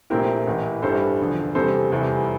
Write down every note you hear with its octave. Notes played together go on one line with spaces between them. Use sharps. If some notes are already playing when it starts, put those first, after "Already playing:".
A#1 A#2 A3 C4 E4 G4 A#4
A1 A2 E3
A1 G2 E3 G3 A4 C5
E1 E2 D3 F3
E2 C3 G3 A4 C5
F1 E2 E3 G3